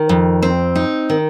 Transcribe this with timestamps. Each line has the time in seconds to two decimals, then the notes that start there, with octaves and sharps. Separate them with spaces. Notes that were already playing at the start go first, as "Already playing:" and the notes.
Already playing: D#3
0.09 F2
0.43 C4
0.76 D#4
1.10 D#3